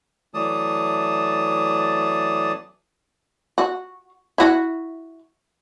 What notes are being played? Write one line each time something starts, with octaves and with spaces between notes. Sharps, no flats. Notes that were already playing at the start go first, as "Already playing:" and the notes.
E3 F#3 A3 D5 A5 D#6
F#4
E4 F#4